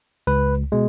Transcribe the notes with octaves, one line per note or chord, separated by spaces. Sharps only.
C#2 B4
B2 G#3